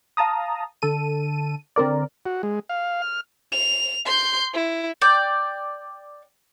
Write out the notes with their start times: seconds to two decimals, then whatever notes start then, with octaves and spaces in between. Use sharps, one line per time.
0.17 F5 A5 A#5 D#6
0.82 D3 A4 D#7
1.76 D3 C4 A#4 D5
2.26 F#4
2.43 G#3
2.69 F5
3.02 F6
3.52 F7
4.05 C6 G6
4.53 E4
5.02 D5 G5